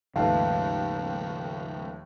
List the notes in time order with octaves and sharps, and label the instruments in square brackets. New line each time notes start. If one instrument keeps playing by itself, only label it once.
[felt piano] D#2 A3 [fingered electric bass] G#2 C#3 F3 [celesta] B4 A5 [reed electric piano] F5